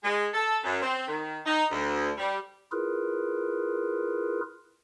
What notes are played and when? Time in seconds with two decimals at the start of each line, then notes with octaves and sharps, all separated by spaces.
0.04 G#3
0.33 A4
0.64 F#2
0.82 C4
1.08 D#3
1.46 D#4
1.71 D2
2.18 G3
2.72 E4 F4 G#4 A#4 B4